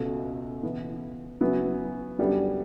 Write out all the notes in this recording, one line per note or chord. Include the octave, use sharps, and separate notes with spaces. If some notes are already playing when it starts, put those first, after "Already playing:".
Already playing: C#2 B2 A3
C#3 E3 B3
C#3 F#3 B3 E4
F#2 D3 G3 B3 D4